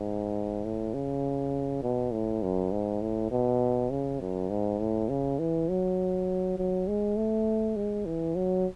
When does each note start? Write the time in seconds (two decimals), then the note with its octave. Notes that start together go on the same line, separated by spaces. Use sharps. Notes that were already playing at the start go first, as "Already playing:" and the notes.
Already playing: G#2
0.64 A2
0.94 C#3
1.83 B2
2.13 A2
2.42 F#2
2.72 G#2
3.01 A2
3.31 B2
3.90 C#3
4.20 F#2
4.50 G#2
4.79 A2
5.09 C#3
5.39 E3
5.69 F#3
6.58 F#3
6.88 G#3
7.17 A3
7.76 G#3
8.06 E3
8.35 F#3